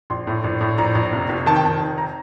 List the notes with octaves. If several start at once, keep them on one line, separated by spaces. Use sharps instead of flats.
A#1 C6
A2
A#1
A2
A#1 A#5
A#1
F1
F1
D#3 A5
G5
F1 A5
D#3
A#5